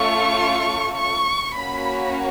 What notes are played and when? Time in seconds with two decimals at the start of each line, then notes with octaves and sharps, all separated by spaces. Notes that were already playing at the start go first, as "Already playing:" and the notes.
Already playing: A3 C#4 F4 A4 C#6
0.99 C#6
1.56 A#3 C#4 F#4 B5